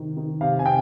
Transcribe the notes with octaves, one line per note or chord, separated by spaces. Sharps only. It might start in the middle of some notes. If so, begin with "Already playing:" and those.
Already playing: C3 D#3
D#3
C3 F5
G#5
C3 G5